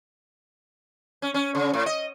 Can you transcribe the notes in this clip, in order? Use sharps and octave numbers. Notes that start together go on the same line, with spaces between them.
C#4
C#4
C#3
A2
D#5